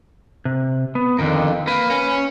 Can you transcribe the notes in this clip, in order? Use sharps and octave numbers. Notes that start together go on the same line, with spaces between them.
C3
B3
F2 D3 D#3 A#4
A#3 B4
C#4